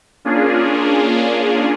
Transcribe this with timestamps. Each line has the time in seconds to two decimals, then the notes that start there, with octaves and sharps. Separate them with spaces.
0.25 A#3 C#4 D4 F4 G#4